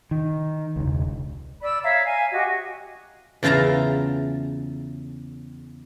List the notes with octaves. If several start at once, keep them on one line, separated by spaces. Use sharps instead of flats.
D#3
E1 C#2
D5 B5 E6
C#5 E5 F5 A#5
F5 G#5
F#4 G4 D#5
E2 C#3 F4 E5 A5 A#5